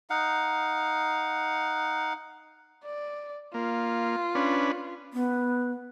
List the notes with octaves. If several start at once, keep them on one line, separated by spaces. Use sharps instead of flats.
D#4 F5 F#5
D5
A#3 F4
C#4 D4 B4
B3